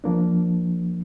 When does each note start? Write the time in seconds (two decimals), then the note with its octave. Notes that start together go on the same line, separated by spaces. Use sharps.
0.04 F3 A#3 D4